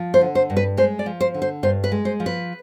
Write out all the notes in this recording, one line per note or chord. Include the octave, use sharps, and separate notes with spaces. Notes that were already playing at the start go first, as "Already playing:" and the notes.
Already playing: F3
C5
D3
C5
G2
B4
G#3 C5
D5
F3
C5
D3
C5
G2 C5
B4
G#3
C5
F3
B4